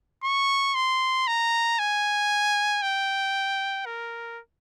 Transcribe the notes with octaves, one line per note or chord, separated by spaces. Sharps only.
C#6
C6
A#5
G#5
G5
A#4